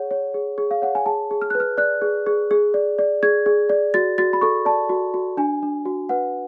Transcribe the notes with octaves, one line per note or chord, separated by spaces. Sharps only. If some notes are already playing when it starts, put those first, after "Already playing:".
Already playing: G#4 C#5 F#5
C#5
G#4
G#4
F5
C#5 F#5
G#5
G#4 A5
G#4
F6
F#6
B4
F6
D5 F#6
G#4
G#4
G#4
D5
D5
G#4 G#6
G#4
D5
F#4 A6
F#4 A6
B5
A4 C#6
D5 A5
F#4
F#4
D4 G#5
D4
F#4
B4 F#5